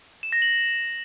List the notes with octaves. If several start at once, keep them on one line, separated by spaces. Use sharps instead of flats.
E7
A#6
F#7